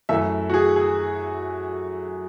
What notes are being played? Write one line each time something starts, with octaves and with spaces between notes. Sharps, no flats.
F#2 E3 A3 E5
F#4
G#4
G#4